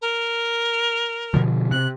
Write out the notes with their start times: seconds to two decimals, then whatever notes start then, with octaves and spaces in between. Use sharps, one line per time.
0.01 A#4
1.34 B2 D3 F3
1.71 C3 F#6